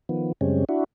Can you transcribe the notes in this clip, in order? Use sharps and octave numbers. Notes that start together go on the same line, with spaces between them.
D#3 F3 B3
F#2 C#3 G3 G#3 C4 C#4
D4 E4 F#4